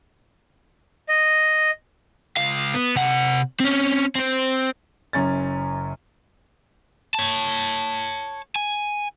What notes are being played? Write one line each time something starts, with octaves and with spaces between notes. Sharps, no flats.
D#5
C#2 F5
B3
C3 F#5
C4 C#4
C4 C5
F#1 F#2 C#4 A6
C#5 A5
G#5